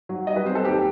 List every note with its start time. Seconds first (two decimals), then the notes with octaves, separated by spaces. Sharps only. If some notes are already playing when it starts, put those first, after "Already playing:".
0.09 F#3
0.27 G3 D#5
0.36 B4
0.46 C4 C5
0.55 A4
0.64 D#2 G4